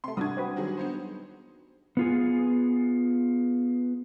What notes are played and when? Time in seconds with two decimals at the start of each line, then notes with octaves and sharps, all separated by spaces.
0.04 C3 A3 C6
0.17 G2 C3 G3 A#3 D4 F#4 D#6 G#6
0.37 C4 F#4 B4
0.56 D#3 F#3 G#4
0.77 B3 D#4 C5
1.97 B3 F4 G#4